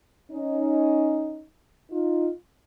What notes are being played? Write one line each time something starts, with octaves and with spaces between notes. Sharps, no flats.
C#4 D#4
D#4 F4